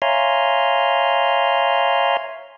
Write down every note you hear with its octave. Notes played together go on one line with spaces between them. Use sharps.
C#5 E5 F5 G#5 A#5 C6